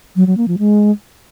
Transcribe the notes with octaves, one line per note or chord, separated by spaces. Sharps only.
F#3
F#3
A#3
F3
G#3